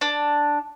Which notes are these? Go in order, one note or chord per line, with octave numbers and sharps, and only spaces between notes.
D4